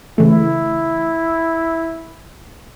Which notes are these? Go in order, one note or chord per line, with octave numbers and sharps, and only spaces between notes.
C#3 E3 A3 E4